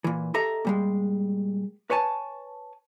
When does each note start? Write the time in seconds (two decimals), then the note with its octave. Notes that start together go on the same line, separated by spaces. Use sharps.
0.04 A#2 E3
0.34 G4 A4 D#5 E5 A#5
0.65 A#2 G3 G#3
1.90 B4 C#5 G#5 A5